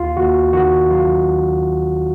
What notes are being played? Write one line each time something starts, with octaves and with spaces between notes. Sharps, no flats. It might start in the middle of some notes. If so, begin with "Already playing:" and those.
Already playing: D#2 F4
D#2 F#4
D#3 F#4
F#3 F4